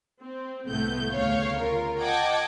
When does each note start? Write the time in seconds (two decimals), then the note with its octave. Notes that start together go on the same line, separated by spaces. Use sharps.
0.22 C4
0.67 C2 A2 A3 B3 G6
1.12 D2 C#3 C#5 F5
1.59 F4 A#4
2.00 D#5 F#5 G5 A5 D6 G#6